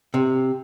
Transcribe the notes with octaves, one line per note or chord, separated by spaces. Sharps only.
C3